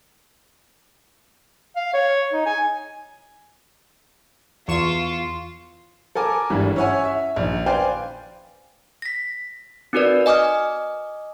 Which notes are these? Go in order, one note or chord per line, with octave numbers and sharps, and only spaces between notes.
F5
C#5
D#4
G#5
E2 F4 C#6 E7
A4 A#4 G#5 D6
G#1 G2 E3 G3 G#3
C#4 E4 C#5 F#5 G#5
E5
A#1 D#3
B4 C5 D5 F5 G5 G#5
A#6 B6
C4 D#4 F#4 A#4 B4 D5
D#5 G#5 D6 D#6 F6